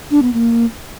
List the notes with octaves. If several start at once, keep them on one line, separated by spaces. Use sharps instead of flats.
D4
B3
A#3